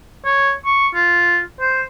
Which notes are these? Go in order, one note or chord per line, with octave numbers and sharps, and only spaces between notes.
C#5
C#6
F4
C5